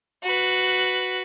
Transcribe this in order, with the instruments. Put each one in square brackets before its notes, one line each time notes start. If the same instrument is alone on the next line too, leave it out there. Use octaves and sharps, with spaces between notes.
[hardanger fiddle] F#4 B4